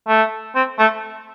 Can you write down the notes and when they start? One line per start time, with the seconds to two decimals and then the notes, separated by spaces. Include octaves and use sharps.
0.08 A3
0.55 C4
0.79 A3